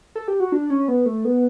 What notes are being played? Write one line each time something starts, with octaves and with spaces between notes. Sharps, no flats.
A4
G4
F#4
D4
C#4
B3
A3
B3